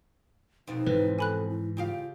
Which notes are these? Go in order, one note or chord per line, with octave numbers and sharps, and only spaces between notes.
F2 B2 C4 D#4
G#2 E3 B4
A4 G#5 B5 F#6
E4
C#3 F4 G4 F5